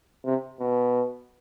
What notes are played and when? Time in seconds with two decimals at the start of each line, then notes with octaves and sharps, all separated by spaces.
0.25 C3
0.60 B2